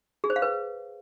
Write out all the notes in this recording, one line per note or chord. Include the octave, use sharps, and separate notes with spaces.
G#4
C5
F5
B4